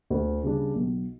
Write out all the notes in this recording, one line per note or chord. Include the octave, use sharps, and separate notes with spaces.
D2
C#3 G3 D4
B1